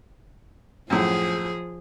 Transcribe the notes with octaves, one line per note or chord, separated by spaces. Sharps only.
F#2 A2 F3 G#4